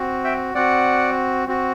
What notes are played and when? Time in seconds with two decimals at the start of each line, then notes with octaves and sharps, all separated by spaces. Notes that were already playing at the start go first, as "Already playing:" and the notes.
Already playing: C4 F#4
0.24 E5 G5
0.55 C4 F#4 D5 F#5
1.48 C4 F#4